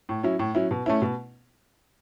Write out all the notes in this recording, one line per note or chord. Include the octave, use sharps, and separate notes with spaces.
A2
F#3 C#4 E4
A2
F#3 C#4 E4
B2
A3 C#4 E4
B2